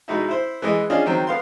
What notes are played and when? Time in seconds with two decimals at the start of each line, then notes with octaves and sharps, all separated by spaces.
0.08 B2 G#3 D#4 E4
0.28 E4 C5
0.62 E3 G#3 D#5
0.90 C#4 D4 F4 G#4 D#5
1.06 D#3 F#3 C4
1.27 B3 F5 C6